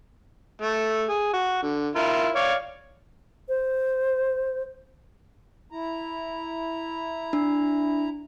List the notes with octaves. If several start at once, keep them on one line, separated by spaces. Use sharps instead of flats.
A3
G#4
F#4
D3
E4 F4 A#4
C#5 D5 F5
C5
E4 A#5
D4